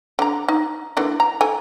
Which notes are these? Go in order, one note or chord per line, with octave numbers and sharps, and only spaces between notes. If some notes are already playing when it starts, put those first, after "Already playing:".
D3 A#5
D#4
D3 E3 A#3
A#5
A4 G#5